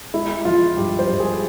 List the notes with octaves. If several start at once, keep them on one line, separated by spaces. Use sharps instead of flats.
G#3 E4
F3 F4
G2 G4
C5
G2
G#4